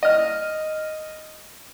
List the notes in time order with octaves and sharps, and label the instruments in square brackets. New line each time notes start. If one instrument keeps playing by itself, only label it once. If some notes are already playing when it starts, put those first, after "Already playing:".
[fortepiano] D#5 F6